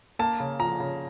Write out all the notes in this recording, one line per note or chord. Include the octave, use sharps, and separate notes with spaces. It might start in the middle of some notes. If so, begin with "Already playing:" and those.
A#3 A5
C#3
F3 A#5
C#3